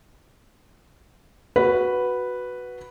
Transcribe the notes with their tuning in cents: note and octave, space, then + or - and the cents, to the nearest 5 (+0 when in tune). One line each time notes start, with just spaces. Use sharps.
F#4 +0 B4 +0